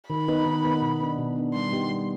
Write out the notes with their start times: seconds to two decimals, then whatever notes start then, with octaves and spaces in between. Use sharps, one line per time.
0.10 D#3 B5
0.28 B3 D#4 B4
0.46 D#3
0.64 B3 D#4 B4
0.82 B2
1.00 B3 D4
1.18 B2
1.36 B3 D4
1.54 G3 C6
1.73 B3 D#4 G4
1.91 G3